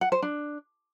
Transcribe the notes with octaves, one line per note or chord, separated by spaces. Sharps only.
F#5
C5
D4